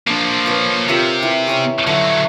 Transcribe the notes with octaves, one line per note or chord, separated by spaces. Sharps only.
F3 A#3 D4
B4 C#5
C3 F4 G4 A#4
E3 E4
C#4 A#5 B5
D3 F#3 A3